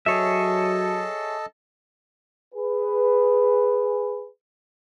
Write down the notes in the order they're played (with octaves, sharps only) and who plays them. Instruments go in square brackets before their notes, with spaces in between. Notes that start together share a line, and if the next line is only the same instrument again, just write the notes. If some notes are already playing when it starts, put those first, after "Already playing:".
[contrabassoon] F#3 [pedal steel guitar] G#4 C#5 E5 [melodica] A4 D#5 A5
[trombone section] G#4 B4